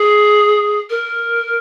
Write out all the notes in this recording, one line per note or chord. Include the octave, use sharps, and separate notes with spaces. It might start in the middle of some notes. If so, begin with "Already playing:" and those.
Already playing: G#4
A#4